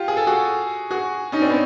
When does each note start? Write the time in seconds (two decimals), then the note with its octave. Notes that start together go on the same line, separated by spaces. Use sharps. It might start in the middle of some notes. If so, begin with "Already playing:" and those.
Already playing: F4 G4
0.08 G#4
0.17 A4
0.27 F#4 G#4
0.91 F#4 G#4
1.32 C#4 D#4
1.42 C4 D4
1.49 B3 C#4